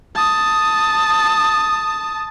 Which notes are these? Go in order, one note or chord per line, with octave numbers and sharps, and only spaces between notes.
A5 D#6